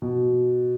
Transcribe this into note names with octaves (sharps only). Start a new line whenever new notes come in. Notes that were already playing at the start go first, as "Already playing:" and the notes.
B2